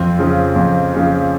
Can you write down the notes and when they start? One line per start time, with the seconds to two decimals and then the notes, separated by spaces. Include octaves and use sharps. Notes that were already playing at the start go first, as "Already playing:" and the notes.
Already playing: F2 C4
0.19 C#3 F3
0.56 F2
0.94 C#3 F3